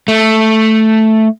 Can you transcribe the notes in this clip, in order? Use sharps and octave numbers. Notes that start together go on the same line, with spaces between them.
A3